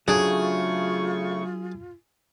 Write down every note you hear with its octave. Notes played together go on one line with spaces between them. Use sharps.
C#3 F#3 A3 D4 F4 G#4 C#6